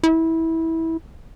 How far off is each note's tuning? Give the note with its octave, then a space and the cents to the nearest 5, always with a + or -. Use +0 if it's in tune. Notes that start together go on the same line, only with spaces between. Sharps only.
E4 -20